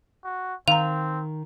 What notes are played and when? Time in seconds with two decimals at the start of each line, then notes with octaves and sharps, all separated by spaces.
0.24 F#4
0.68 D#3 C4 F5 A#5 F7